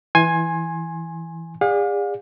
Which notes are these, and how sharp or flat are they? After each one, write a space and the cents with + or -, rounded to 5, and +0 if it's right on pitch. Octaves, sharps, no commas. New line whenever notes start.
E3 +0 G#5 +0 C6 +25
G#4 -40 D5 +0 F5 +40